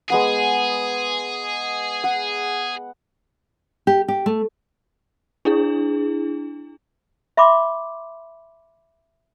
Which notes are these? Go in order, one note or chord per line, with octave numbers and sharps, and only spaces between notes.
G#3 B3 G#4 F#5
F#5
G4
G4
A3
D4 E4 G#4
E5 B5 C6 D6